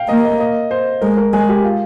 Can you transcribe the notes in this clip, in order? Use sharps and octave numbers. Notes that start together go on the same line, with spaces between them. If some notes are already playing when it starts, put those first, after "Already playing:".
Already playing: F5 G5
A#3 D#5
D#5
D#5
C5
G#3 A#4
A#4
G#3 G#4
G4
F4